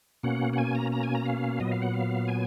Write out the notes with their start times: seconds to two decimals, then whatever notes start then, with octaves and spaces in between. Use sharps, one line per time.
0.23 B2 A#3 C#4 F#5
0.53 F#5
0.58 G#5
0.75 A#5
0.92 A#5
1.03 G#5
1.15 A#5
1.25 F5
1.60 A#2 F#3 B3 D#5
1.71 F5
1.82 F#5
1.94 F5
2.28 G#5